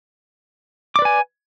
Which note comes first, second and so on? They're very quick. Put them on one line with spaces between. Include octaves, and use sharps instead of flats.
D6 D5 B4 G#5